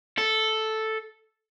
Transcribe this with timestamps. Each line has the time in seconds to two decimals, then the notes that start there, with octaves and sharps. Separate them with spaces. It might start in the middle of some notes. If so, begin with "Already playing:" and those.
0.18 A4